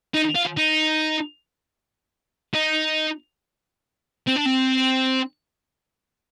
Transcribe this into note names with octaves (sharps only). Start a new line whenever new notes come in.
D#4
F4
D#4
D#4
C4
D4
C4